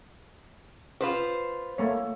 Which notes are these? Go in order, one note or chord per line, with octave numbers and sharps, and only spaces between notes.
F4 B4 C5
A3 A#3 C#5